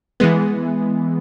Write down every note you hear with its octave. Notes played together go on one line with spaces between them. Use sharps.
E3 G#3 B3